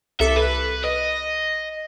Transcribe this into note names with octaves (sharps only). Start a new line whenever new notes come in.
C2 A4 E5 D6
B4
D#5